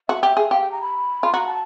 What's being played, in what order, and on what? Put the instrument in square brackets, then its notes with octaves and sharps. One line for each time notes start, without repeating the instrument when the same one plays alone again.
[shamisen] F#4 [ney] E5
[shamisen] G4
G#4
[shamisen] G4 [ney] F5
[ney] G5
A#5
B5
[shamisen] F4
[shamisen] F#4 [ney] A#5
[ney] A5